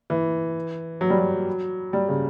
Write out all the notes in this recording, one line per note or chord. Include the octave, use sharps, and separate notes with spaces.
E3
F#3
G3
F#3
G3
C#3